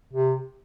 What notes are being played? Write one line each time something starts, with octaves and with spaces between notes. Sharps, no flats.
C3